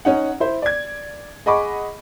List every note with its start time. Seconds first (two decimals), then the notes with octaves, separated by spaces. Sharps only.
0.05 C#4 D#4 F#5
0.40 E4 C5
0.62 D5 G#6
1.46 G#4 D#5 F#5 B5 C#6 D6